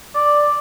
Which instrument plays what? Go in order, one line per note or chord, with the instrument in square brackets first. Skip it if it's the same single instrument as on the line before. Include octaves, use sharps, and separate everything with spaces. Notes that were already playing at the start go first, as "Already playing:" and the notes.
[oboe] D5